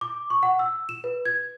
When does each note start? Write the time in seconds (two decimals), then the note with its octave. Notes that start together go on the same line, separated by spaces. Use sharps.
0.01 D6
0.30 C#6
0.43 F#5
0.59 E6
0.89 E7
1.04 B4
1.25 G#6